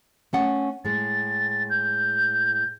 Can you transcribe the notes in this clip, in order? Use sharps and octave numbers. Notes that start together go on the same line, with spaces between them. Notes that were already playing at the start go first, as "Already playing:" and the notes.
A3 C#4 F#5
A2 G#3 A6
G6